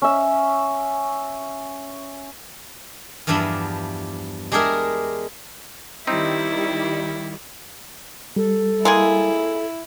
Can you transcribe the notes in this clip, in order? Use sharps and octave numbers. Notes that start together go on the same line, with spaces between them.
C#4 E5
E2 G2 F3 D4 E5 B5
G#3 D4 G4 G#4 A#4 E5
D#3 G3 C4 D#4 E4
G3 A4
G#3 A#3 E4 G#4